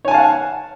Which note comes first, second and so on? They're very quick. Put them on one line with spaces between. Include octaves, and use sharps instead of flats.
C#5 G#5 A5 F5 F#5